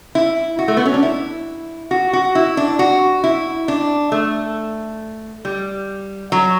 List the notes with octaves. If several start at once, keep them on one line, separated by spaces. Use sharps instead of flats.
E4
F#4
A3
B3
C#4
D4
E4
F#4
F#4
E4
D4
F#4
E4
D4
A3
G3
F#3